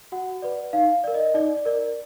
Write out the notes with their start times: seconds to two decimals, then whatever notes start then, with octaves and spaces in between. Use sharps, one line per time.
0.12 F#4 F#5
0.42 B4 D5
0.73 D#4 F5
1.04 A#4 D5
1.14 D#5
1.34 D#4 D5
1.65 A#4 D5